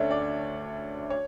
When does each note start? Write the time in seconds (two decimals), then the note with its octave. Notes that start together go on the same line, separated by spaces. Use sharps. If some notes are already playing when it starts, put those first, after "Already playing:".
Already playing: D2 D3 A3 C#4 C#5 D5 E5
0.11 D5
1.10 C#5